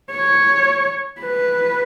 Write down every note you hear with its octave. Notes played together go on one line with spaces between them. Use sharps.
C#5
B4